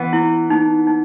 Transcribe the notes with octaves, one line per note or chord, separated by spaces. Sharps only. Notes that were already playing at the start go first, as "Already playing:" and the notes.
Already playing: E3 B3
E4
D#4
D#4